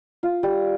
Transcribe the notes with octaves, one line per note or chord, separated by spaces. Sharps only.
F4
G3